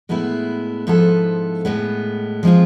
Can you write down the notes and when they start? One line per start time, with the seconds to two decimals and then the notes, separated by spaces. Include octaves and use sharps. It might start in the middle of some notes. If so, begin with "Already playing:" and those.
0.09 A2 G#3 B3 E4
0.87 G#2 F3 B3 E4 A4
1.65 A2 G#3 B3
2.43 F3 G#3 C4 F4